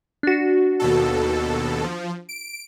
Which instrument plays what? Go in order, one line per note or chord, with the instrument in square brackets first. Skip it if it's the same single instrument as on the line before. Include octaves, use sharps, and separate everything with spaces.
[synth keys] D4 F#4
[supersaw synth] D#2 B2 A4
F3
D7